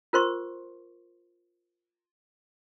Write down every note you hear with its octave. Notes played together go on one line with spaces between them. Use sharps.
F4 A#4 C5 C6 C#6